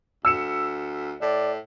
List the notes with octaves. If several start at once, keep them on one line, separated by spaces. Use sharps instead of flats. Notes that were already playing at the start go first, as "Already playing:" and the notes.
D2 E6 C#7 E7
A2 D5